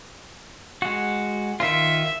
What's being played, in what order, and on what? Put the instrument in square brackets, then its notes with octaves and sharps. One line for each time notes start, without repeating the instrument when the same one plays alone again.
[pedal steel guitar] G#3 F#4
[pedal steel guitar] D#3 F4 [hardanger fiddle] E5